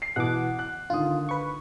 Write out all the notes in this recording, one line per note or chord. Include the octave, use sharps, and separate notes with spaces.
C7
B2 E3 F#5 D6
F#6
D3 D#3 F4 D#6
B4 C#6